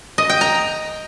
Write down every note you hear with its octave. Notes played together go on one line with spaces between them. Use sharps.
D#5
G5
A#5